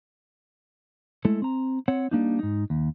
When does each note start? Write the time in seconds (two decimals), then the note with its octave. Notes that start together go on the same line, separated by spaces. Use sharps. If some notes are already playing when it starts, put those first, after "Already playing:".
1.25 G#3 A3 E4 A4
1.42 C4 A#5
1.88 C4 C#5 F#5
2.11 G3 A#3 D4 D#4
2.39 G#2 D#4
2.70 D#2